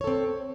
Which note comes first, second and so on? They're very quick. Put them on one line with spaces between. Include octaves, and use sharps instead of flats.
C#5 A4 C4